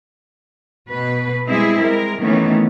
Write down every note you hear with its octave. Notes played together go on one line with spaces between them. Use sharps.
B2 B4
G3 G#3 C4 E4 G#4
G#3 A#4
D#3 E3 A3 B3 C#4